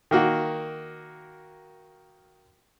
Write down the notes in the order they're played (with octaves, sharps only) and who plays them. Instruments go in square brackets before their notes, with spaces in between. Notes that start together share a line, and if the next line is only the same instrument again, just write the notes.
[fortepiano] D#3 A#3 F#4